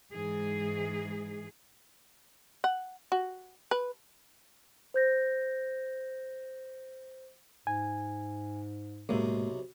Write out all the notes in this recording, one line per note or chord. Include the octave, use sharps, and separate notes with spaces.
G#2 E3 G#4
F#5
F#4
B4
C5 G6 A#6
G#2 G#5
B1 A2 C3 G#3 A#3